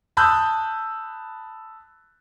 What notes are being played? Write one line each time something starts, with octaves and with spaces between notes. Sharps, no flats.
A5 B5 D#6 E6 F#6 G6